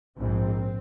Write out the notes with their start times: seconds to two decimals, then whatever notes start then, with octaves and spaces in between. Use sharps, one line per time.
0.18 A#1 G#2 C4